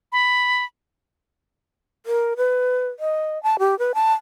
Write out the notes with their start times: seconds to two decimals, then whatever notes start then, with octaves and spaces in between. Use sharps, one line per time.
0.12 B5
2.06 A#4
2.37 B4
3.00 D#5
3.43 A5
3.59 G4
3.79 B4
3.95 A5